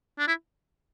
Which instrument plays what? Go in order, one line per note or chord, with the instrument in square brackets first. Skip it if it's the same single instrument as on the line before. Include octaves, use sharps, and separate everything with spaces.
[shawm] D4
E4